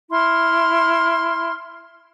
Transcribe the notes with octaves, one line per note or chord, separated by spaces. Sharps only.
E4 C6 F6